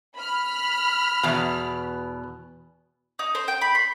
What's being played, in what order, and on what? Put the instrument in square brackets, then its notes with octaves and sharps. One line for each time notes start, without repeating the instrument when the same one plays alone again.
[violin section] B5 F6
[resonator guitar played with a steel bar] E2 B2
[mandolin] D#4
C5
G5
B5
C6